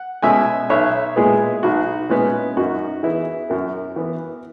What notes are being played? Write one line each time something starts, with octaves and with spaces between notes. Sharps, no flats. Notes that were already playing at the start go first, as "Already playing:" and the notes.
Already playing: F#5
B2 G#3 C#4 E5 G#5
B1 C#5 E5
A#2 G#3 B3 E4 G#4
B1 D#4 F#4
A#2 G#3 B3 C#4 E4
F#2 D#4 F#4
E3 B3 E4 G#4
F#2 F#4 A#4
E3 B3